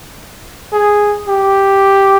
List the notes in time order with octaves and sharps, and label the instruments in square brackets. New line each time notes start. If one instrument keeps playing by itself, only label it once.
[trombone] G#4
G4